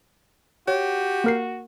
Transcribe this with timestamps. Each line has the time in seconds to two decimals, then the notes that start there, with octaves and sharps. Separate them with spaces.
0.68 F#4 G4 C#5
1.24 A#3 A#4 C7